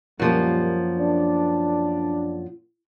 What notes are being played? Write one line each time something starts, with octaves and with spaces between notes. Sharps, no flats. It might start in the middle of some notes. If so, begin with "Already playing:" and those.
F#2 A#2 F3 G3 A#3
D4